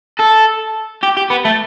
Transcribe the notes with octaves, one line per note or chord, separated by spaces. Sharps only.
A4
G4
G4
B3
A3